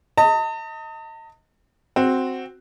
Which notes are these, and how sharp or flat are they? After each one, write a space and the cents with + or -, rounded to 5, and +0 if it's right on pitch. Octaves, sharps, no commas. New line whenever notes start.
D#5 +20 A5 +45
C4 +0 F#4 +0